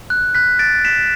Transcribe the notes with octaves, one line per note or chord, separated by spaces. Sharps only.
F#6
F#6 B6
A6 D7
B6 E7